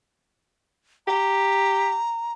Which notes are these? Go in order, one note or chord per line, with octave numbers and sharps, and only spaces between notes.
G4 A#5